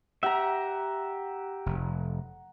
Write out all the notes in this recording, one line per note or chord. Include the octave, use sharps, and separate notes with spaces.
G4 E5 F#5 A#5
F1